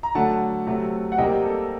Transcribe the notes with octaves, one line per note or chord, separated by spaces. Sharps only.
A#5
D3 F#3 A3 F#5 A5
C3 F#3 A3
F#5
C3 G3 A#3 D#5 G5
A4